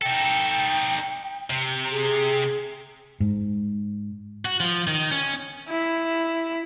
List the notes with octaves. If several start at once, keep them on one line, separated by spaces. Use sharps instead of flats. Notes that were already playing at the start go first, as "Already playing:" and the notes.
D#4 A4 G5
C3
G#4
G#2
F#4
F3
D#3
C#4
E4